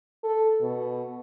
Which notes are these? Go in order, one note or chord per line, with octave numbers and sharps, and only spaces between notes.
A4
B2